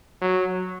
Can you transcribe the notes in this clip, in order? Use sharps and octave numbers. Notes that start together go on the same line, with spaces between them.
F#3